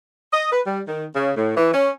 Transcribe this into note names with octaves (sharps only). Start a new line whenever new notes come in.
D#5
B4
G3
D#3
C#3
A2
E3
C#4